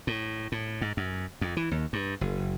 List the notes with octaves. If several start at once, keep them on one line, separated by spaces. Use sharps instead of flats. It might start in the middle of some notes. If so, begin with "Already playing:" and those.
A2
A2
G#2
F#2
F2
E3
D#2
G2
F#1